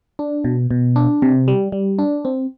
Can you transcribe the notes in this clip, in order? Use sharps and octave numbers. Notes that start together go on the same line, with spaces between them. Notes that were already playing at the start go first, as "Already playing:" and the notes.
D4
B2
B2
D4
C3
G3
G3
D4
C4